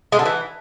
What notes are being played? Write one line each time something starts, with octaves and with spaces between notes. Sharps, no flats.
G#3
D3
E3